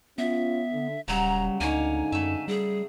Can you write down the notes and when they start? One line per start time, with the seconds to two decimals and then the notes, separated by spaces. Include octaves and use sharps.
0.18 B3 C#4 F4 E5
0.72 D3
1.08 D#1 C#3 F#3 G3 A#5
1.61 D2 G#2 D3 A#3 D#4 C#5 G#5
2.12 F#2 A3 E5
2.48 G3 G#4